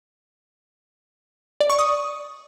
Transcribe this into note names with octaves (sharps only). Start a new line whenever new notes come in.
D5
C#6
D#6